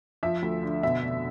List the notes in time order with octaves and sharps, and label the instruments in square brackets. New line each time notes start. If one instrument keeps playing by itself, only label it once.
[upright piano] F3 E5
D2
D3
B2 E5
F1